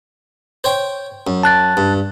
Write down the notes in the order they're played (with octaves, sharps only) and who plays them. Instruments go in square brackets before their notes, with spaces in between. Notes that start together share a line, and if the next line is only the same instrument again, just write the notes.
[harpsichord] C5 C#5 G5
F#2
[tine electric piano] A5 F#6 A6
[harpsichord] G2